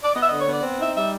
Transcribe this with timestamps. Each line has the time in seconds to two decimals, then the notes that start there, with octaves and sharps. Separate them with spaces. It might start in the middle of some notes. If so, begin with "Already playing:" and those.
0.03 D5
0.15 B3 D#5
0.22 E5
0.27 D3 D#5
0.39 C#5
0.47 B3 D5
0.63 C4
0.79 D#4 E5
0.95 G3 E5